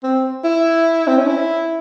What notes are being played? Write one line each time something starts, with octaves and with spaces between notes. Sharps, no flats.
C4
E4
C4
C#4
E4